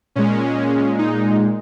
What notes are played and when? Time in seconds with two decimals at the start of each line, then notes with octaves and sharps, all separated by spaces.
0.16 A#2 G#3 C#4
0.99 D#4